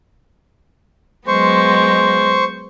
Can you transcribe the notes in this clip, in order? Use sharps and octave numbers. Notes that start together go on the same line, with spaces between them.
F#3 G#3 B3 C5 C#6